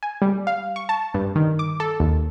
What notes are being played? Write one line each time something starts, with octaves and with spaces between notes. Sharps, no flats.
G#5
G3
F5
C#6
A5
G2
D#3
D6
A4
D#2